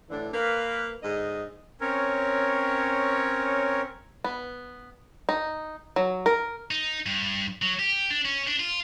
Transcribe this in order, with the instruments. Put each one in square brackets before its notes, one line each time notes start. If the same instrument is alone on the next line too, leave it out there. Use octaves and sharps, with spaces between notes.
[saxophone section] A2 D3 E3 D4
A#3 B4
G#2 D3 D#5
[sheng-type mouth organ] C4 C#4 A#4 C#5
[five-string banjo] B3
D#4
F#3
A#4
[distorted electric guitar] D#4
G2
F#3
G4
D4
C#4
D4
F4